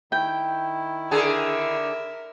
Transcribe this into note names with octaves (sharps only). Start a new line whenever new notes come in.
D#3 E4 G5
D3 G#4 A#4 E5